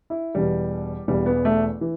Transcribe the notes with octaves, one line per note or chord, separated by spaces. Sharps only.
E4
E1 E2 B2 G3
E1 E2 B2 G3
B3
A3
E3